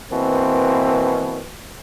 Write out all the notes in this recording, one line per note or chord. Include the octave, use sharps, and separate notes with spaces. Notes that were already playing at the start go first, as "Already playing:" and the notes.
B2 E3 A#3 C4